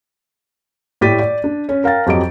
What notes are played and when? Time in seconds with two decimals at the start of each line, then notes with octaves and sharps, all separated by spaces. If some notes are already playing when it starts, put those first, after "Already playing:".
1.01 A2 G4 D5 A6 B6 D#7
1.19 D5
1.44 D4
1.69 C#4
1.84 A#4 F5 G5 A6
2.06 F2 F#3 G4 D#5 D7